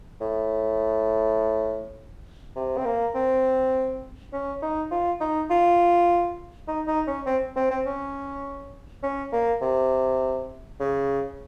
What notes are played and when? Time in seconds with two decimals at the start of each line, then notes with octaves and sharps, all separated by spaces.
0.21 A2
2.56 C3
2.78 C4
2.86 A#3
3.15 C4
4.33 C#4
4.62 D#4
4.91 F4
5.21 D#4
5.50 F4
6.68 D#4
6.87 D#4
7.07 C#4
7.26 C4
7.56 C4
7.71 C4
7.86 C#4
9.03 C#4
9.33 A#3
9.61 C3
10.80 C#3